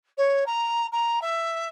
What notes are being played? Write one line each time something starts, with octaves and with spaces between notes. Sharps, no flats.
C#5
A#5
A#5
E5